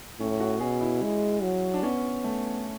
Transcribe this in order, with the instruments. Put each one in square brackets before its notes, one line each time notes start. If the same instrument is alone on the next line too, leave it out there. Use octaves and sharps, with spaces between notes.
[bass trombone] A2 [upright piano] C#4
[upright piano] F#4
[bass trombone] B2 [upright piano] G#4
[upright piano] E4
[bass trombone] G#3
F#3
[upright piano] D4
[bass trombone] B3 [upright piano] C#4
[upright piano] A3